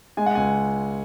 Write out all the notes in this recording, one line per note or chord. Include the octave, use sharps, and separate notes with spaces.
G#3 G#5
F#5
C#2 G#5